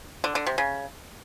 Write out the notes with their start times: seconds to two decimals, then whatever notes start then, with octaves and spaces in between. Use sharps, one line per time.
0.24 D3
0.35 D3
0.47 C3
0.58 C#3